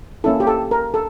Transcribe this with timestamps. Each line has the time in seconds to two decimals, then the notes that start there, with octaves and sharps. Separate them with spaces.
0.24 A#3 C#4 E4 A4
0.40 G4
0.47 A4
0.71 A#4
0.94 A4